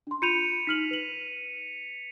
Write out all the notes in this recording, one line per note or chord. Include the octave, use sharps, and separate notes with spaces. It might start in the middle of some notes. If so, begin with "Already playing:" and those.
D4 C6
F4 B5 G6 C#7 D#7 F7
D#4 F6 B6 F#7
B4 F#7